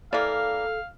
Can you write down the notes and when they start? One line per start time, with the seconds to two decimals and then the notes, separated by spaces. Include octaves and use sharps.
0.13 E3 A#3 A4 D5 F5